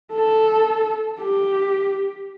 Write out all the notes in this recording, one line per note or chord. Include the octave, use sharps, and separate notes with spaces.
A4
G4